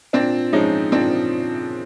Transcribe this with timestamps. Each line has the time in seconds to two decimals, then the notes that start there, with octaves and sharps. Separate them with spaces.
0.13 A#2 C4 D4
0.53 F3 G#3 C#4 D#4
0.92 A#2 C4 D4